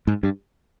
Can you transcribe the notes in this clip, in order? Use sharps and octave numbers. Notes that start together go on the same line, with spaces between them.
G#2
G2